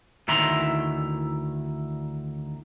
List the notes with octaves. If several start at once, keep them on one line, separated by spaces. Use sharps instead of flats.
D2 D#3 E4 E5 A#5 C6